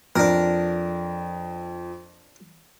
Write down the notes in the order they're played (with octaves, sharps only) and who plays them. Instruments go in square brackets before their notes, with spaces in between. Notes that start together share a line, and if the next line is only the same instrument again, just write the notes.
[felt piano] F2 [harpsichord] D4 A#4